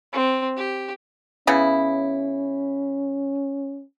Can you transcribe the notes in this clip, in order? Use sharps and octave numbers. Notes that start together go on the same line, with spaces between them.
C4
G4
C#3 B3 C#4 E4